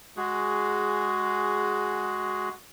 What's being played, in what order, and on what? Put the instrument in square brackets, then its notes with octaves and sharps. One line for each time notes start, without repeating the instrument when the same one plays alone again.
[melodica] G#3 F#4 G#4